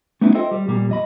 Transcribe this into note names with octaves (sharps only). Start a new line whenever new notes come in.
A3 B3 C#4 D#4 E4
F4 A4 C5 D#5 E5 G5
G3
A#2 G3 A#3
F2 D#5 B5